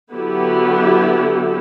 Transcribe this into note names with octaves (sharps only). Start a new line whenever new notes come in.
D3 F#3 B3 E4 G4